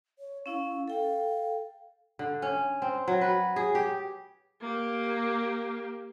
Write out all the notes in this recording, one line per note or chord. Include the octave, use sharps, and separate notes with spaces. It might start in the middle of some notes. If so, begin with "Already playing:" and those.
C#5
C#4 E4 F5
A4 F5 G5
D3
C#4
C4
F#3
B4
G#4
G4
A#3 G4